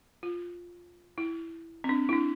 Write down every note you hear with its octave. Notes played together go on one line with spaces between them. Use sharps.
F4
E4
C4
D4
E4
D4